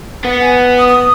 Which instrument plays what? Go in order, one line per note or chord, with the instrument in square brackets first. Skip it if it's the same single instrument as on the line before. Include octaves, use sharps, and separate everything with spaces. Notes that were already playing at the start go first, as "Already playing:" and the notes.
[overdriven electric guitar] B3 [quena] F#5
[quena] G#5
D#6
D#6